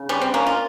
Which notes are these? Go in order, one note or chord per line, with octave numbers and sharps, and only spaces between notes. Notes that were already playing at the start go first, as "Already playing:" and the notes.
Already playing: C#3
G3 C#4
C4
A#3 C#4
F4